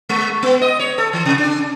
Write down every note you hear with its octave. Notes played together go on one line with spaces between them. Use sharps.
G#3
B3
D#5
C#5
A4
E3
C3
D4